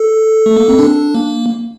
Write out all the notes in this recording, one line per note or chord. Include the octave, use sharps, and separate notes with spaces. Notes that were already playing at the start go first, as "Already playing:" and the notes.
Already playing: A4
A3
A#3
C4
D4
A#3